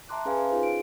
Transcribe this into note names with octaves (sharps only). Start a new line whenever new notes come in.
E5 A5 A#5 C6 D6 F#6
C#4 G#4 B4 F5 G#5 C6
D#4 F4 G#4 C5
D7